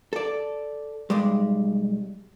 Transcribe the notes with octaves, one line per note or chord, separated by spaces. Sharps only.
A4 D5
B1 G3 G#3